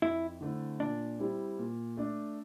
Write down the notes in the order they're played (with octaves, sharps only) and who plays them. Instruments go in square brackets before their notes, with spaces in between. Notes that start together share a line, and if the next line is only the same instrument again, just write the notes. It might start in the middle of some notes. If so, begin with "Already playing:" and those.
[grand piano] F2 [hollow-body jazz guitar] E4
[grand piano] D3 A3 C4 E4
[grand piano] A#2 [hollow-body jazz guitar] D4
[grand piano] G3 C4 E4
A#2
A3 D4